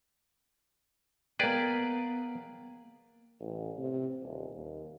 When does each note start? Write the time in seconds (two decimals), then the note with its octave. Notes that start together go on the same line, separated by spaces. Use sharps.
1.39 A#3 B3 G#4 B4 D5 G5
3.40 A1
3.78 C3
4.22 D#1
4.54 D#2